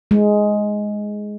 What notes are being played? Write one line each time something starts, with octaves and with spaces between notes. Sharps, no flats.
G#3